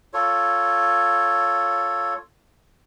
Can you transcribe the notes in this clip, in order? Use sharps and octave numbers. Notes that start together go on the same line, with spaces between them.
F4 A4 C#5